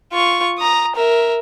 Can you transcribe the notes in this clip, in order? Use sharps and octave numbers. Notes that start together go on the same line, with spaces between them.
F4 C#6
A#5 D#6
A#4 E5